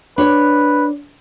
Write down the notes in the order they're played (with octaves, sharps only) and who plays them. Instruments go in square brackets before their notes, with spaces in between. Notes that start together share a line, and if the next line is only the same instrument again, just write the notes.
[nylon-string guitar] D4 C#5 [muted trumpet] B4